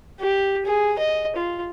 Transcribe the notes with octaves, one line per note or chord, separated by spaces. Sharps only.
G4
G#4
D#5
F4